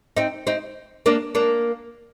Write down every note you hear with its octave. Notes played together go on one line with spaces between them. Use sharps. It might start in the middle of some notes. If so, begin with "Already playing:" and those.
C4 D#4
C4 D#4
A#3 D4
A#3 D4